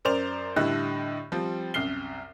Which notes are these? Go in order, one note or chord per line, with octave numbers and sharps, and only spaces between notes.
F#2 A#4 C5 D5 F7
A2 D3 G3 E4 D#5 F#6
F3 G3 C4
C2 F#2 F6 C7 G7